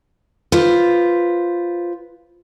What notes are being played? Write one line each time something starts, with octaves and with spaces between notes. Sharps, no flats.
F4 B4 C5